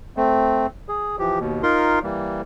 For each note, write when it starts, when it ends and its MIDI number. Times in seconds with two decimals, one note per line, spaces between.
0.17 0.66 57
0.17 0.66 60
0.89 1.16 68
1.19 1.39 52
1.19 1.39 53
1.19 1.39 67
1.40 1.62 39
1.40 1.62 47
1.63 1.99 63
1.63 1.99 65
1.63 1.99 70
1.63 1.99 84
2.03 2.42 52
2.03 2.42 55
2.03 2.42 58